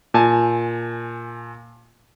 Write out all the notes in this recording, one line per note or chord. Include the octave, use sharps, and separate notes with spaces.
A#2 G#5 A5